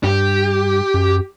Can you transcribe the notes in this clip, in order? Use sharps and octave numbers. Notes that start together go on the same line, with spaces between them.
G2 G4
F#2